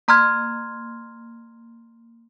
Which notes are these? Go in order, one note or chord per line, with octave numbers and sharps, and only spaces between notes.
A#3 A#5 C6 F6 G#6